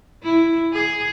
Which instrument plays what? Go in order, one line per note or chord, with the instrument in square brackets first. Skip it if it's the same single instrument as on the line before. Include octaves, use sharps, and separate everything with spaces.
[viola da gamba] E4
G#4